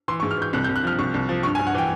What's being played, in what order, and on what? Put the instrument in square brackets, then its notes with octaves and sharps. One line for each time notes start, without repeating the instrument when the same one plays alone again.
[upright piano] E3 C6
C#6
G#2
F6
E3 G6
C2 F#6
G6
C2
F#6
F3 F6
C2 C#6
C2
F3
G2 C#6
G#5
G2
F#5
E3 G5